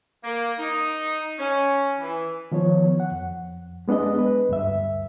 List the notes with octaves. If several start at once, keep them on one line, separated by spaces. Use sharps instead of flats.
A#3
D#4
C#4
E3
D#3 F3 B3 C#5
F#5
F2
G#3 B3 D4 G#4 D#5
B4
D2 G2 E5